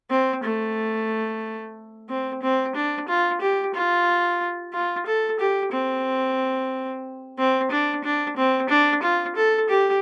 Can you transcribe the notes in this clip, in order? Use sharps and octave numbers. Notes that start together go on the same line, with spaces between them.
C4
A3
C4
C4
D4
F4
G4
F4
F4
A4
G4
C4
C4
D4
D4
C4
D4
F4
A4
G4